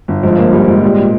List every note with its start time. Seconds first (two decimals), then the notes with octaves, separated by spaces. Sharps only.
0.08 G1
0.23 G#2 F3
0.38 A#3
0.53 G3
0.68 G#2
0.82 A#2 G3
0.98 A#2